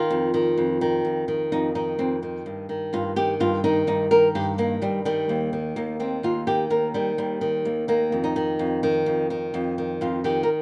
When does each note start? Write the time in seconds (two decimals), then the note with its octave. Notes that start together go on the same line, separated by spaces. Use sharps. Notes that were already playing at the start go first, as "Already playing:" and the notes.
Already playing: D#3 F4
0.10 F2
0.34 D#3
0.57 F2
0.81 D#3
1.05 F2
1.28 D#3
1.52 F2 D#4
1.75 D#3 D#4
1.99 F2 C4
2.23 D#3
2.46 G2
2.69 D#3
2.93 G2 F4
3.16 D#3 G4
3.40 G2 F4
3.64 D#3 D#4
3.87 G2 D#4
4.11 D#3 A#4
4.35 G2 G4
4.58 D#3 A#3
4.82 G2 G3
5.05 D#3 G3
5.29 D#2
5.53 D#3
5.76 D#2 A#3
6.00 D#3 C4
6.23 D#2 F4
6.47 D#3 G4
6.70 D#2 A#4
6.94 D#3 G3
7.18 D#2 G3
7.41 D#3
7.65 D#2
7.88 D#3 A#3
8.12 F2
8.24 D#4
8.36 D#3
8.59 F2
8.83 D#3
9.06 F2
9.30 D#3
9.54 F2
9.78 D#3
10.01 F2 F4
10.24 D#3 G4
10.43 A#4